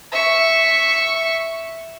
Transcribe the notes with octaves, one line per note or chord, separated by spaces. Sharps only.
E5 C#6